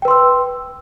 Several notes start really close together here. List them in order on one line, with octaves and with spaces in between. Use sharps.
G5 B4 C6 E6